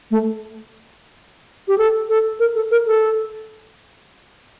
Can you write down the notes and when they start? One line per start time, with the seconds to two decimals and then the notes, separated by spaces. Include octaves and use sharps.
0.11 A3
1.68 G4
1.78 A4
2.09 A4
2.40 A#4
2.55 A4
2.71 A#4
2.86 A4